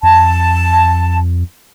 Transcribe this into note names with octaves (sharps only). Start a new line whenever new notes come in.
F2 A5